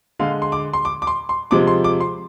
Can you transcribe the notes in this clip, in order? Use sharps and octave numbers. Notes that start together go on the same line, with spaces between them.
D3 G#3 F5
C6
D6
C6
D6
D6
C6
C6
C3 F3 G#3 D6
C6
D6
C6